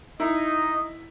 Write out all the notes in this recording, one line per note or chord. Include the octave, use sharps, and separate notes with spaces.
D#4 E4 D#5